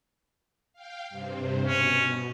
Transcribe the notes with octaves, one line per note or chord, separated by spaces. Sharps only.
F5 G5
G2 C3 C4
B2 C#4